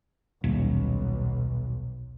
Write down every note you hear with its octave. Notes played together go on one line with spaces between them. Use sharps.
D#1 B1